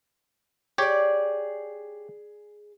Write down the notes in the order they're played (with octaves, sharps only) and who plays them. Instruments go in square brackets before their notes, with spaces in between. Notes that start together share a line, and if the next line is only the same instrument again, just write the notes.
[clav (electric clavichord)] G4 C#5 [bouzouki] G#4 D5